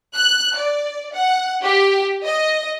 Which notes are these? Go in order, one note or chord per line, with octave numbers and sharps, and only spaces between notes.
F#6
D5
F#5
G4
D#5